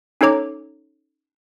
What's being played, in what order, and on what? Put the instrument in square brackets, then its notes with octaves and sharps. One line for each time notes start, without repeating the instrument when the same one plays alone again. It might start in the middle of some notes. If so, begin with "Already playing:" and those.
[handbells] C#4 D#4 A4 C#5 A#5 D6